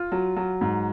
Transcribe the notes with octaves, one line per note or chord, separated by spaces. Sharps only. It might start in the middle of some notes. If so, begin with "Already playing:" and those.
Already playing: F4
F#3
F#3
G#2